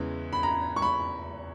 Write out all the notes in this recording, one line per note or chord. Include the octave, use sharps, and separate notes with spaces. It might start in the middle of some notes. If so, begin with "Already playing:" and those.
Already playing: E2 C#3 E3 G#3
B5
A#5
C#6
B5